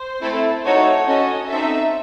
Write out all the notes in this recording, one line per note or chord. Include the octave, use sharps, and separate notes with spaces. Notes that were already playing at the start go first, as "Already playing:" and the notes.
Already playing: C5
A3 C4 E4 A4
A3 D#4 F#4 A4 C#5
C#4 F#4 A4 D#5
C4 D#4 A4 E5